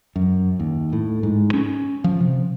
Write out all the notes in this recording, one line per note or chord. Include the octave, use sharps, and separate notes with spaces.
F#2
D#2
A2
G#2
C#4
F3
C3